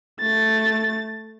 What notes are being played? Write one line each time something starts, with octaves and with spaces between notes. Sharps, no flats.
A3 A6